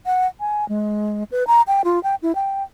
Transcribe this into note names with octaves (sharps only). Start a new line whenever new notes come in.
F#5
G#5
G#3
B4
A#5
G5
F4
G5
E4
G5